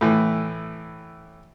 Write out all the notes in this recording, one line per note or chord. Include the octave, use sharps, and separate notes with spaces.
A2 E3